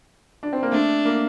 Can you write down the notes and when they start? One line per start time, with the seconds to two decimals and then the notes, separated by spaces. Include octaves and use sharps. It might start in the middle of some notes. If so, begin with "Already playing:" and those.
0.43 D4
0.53 C4
0.63 A#3
0.72 A3 D4
1.05 A#3